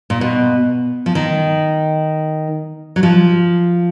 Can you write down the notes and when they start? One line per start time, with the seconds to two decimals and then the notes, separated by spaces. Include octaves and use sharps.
0.10 A#2
0.21 B2
1.06 F3
1.15 D#3
2.96 F#3
3.03 F3